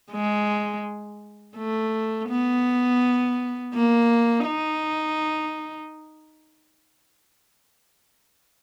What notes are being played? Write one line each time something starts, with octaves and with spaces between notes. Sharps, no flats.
G#3
A3
B3
A#3
D#4